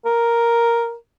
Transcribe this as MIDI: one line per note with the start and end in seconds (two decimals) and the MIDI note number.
0.06 0.95 70